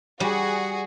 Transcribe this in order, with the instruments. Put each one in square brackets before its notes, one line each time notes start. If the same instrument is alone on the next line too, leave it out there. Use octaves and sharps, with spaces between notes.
[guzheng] G3 [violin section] F#4 G#4